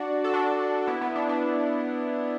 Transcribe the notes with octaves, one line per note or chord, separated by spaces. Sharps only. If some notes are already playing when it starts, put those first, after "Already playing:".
Already playing: D4 F#4
A4
D4 F#4
B3 E4
B3
D4
D4